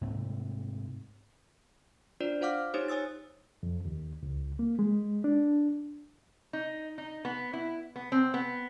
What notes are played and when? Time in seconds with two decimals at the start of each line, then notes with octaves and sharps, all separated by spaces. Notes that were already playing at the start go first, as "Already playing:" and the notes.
0.01 G#2 C3 A3
2.20 D4 F4 C5 D5
2.41 F4 C5 F5 F#5 D6 F6
2.74 D#4 G4 C5 C#5 D#6
2.88 C#5 G#5 D#6 E6 A6
3.63 F2
3.85 D#2
4.23 C#2
4.59 A#3
4.79 G#3
5.24 D4
6.53 D#4
6.98 D#4
7.25 B3
7.53 E4
7.96 B3
8.12 C4
8.34 B3